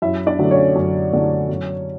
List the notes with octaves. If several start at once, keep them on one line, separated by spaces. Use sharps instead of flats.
F#2 E4 E5
D4 D5
D3 F#3 A3
C#4 C#5
F#2
D3 F#3 A3
F#2